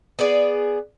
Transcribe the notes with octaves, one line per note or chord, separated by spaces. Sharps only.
B3 G#4 D5